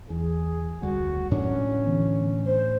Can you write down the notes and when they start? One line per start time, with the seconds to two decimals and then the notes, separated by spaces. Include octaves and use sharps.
0.10 E2 G#4
0.82 F1 D2 G3 F#4
1.31 A2 F#3 C#4 D4
1.85 D3 E3 B3
2.46 C5